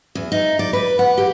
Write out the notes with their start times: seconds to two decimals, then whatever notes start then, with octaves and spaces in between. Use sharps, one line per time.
0.15 E2
0.32 D#4
0.59 D5
0.73 B4
0.99 F#5
1.18 G4